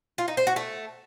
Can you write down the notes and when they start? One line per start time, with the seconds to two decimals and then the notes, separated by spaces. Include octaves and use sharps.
0.18 F4
0.28 D#4
0.37 C5
0.47 F#4
0.56 A3